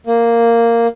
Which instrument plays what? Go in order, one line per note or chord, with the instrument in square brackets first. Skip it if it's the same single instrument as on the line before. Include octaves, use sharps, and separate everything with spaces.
[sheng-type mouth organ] A#3